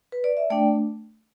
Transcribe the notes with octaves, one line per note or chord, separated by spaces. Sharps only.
B4
D5
E5
A3 D4 D5 G5